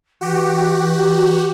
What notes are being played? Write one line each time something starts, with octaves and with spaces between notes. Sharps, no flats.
E3 F#4 G4